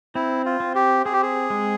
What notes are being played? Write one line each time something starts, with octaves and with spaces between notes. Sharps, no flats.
C4 E4
F4
C4
G4
C4 G#4
G4
G#4
G#3